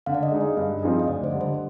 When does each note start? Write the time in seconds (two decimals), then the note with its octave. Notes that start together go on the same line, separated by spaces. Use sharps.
0.06 D3 F5
0.14 D5
0.23 D#5
0.32 G#3 D#4 G#4
0.41 D#5
0.57 G2 F5
0.82 F3 C4 D#4 G#4 F5
0.99 D#5
1.08 D2 D5
1.24 C5
1.32 D3 G3
1.41 C5